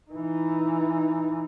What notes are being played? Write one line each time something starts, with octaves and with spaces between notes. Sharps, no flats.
E3 D#4